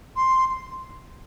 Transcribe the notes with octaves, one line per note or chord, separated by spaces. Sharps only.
C6